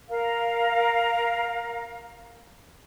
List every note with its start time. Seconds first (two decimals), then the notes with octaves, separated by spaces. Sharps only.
0.09 A#4 F5